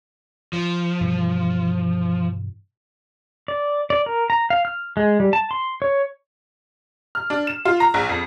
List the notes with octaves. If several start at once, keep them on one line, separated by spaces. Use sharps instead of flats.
F3
G2 B2 E3
D5
D5
A#4
A#5
F5
F6
G#3
G3
A5
C6
C#5
F6
D4
E7
F4
A#5
A#1
F2